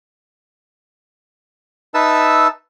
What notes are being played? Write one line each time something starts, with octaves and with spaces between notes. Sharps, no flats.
D#4 B4 E5 A5 E6